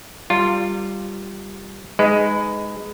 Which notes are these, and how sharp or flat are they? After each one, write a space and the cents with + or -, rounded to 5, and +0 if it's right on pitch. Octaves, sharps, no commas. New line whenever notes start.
G3 +0 F4 +0 A#4 -35
G#3 +0 D#4 +0 B4 +25